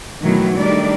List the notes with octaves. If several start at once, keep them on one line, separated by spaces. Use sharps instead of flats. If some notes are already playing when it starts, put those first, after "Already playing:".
B2 D#3 E3 F#3 A3 B3
D#3 G3 A3 D4 D#4 D5